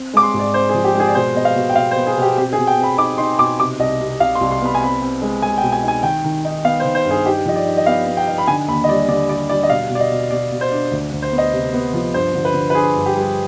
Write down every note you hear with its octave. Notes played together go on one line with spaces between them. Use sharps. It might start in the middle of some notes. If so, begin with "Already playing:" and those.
Already playing: C4
G#3 D6
C6
G#2
D5
C4 C5
G#4
F3
G4
G#3
G#4
D5
B2 C5
B3 D#5
F5
B2
G5
B2 F5
C5
B3
G#4
B2
G4
C4 G4
G#4
B2
G5
C4
B5
D#4 D6
D#4 C6
B2 D6
C3 D6
C2 D#5
C3
C2 F5
C6
C2
C6
B3 B5
G#5
C4 B5
C4
G#3
G#3 G#5
G5
B2
G#5
D#4 G#5
D#3 G5
D#3
D#4
B3 F5
C5
D#3
C5
G2
G#4
D#4 G4
F3 D#5
D5
D#4
D#5
B3 F5
B3
G5
D#4
B5
D3 G#5
D#2 B5
D#5
G3 D5
D3 D5
G3 D5
G3 D5
D#5
B2 F5
B2
D5
D#5
B2
B2 D5
B2
C5
D4
D2
D2
C5
B3
D#5
C3
B3
F3
G2 C5
D3
B4
D3
B4
D4 G#4
G2
G4
G3